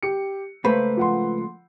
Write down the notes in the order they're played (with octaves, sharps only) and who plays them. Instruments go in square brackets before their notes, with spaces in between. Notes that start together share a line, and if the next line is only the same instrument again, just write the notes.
[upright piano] G4 C#7
[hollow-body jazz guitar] C#2 A3 A#3 [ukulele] B4 [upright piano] C5
[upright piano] F3 F#5 C6